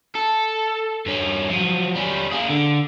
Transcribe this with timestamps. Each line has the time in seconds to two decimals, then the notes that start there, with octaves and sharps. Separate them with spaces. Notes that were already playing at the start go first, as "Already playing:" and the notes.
0.15 A4
1.06 G2 C#4
1.50 F3 F#3
1.96 G3 C#4
2.32 A#3 G#4
2.50 D3